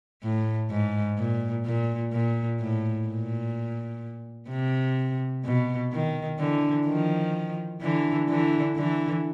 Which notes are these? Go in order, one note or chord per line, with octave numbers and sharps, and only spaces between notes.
A2
G#2
A#2
A#2
A#2
A2
A#2
C3
B2
D#3
D3 E3
D#3 F3
D3 E3
D3 E3
D3 E3